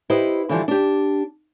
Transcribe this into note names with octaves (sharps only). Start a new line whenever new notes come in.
E4 G4 B4 C5 D#5
D3 E3 F3 G3
D4 G4